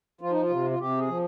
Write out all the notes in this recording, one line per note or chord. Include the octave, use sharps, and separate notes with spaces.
F3 F4
D#4
F4
C3
F4
C3 G4
G#4
F3